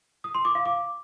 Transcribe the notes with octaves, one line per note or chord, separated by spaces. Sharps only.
D#6
C6
D6
F5
D6